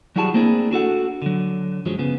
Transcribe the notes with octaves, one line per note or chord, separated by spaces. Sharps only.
F#3 G3 E4 F#4 G#4 A5
A3 A#3 C4 D4 E4 G#4
D4 F#4 A4 F#5
D3 F#3
F#2 F3 F#3 G#3
C#3 B3